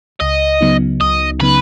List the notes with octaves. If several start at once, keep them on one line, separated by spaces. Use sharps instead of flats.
C#2 D#5
C#3 F#3 B3 D#4
C#2 D#5
C#3 F#3 B3 D#4 B4